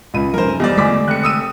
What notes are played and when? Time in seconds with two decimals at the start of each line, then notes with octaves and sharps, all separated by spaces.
0.14 C#2 B5 D#7
0.34 F1 F#2 A#4 C5
0.60 E2 G3 D5 D#5
0.77 D3 G#3 A3 G#5 D6 B6
1.08 F1 F#6 C#7
1.23 D#6 E6 D#7